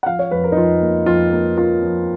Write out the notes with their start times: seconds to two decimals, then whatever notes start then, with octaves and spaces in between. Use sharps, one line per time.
0.03 F#5
0.06 F3 F5
0.19 C#5
0.31 F2 B4
0.44 A#4
0.52 D#4
0.57 F2 F4
0.82 A#3
1.06 F2 F4
1.32 A#3
1.57 A#3 F4
1.82 F3